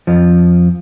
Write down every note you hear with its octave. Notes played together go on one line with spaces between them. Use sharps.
F2 F3